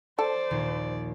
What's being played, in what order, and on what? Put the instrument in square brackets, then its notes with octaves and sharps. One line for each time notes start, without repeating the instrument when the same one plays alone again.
[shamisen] A4 [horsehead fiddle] C5 [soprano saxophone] D5
[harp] A#1 D#2